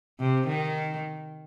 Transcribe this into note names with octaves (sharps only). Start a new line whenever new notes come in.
C3
D#3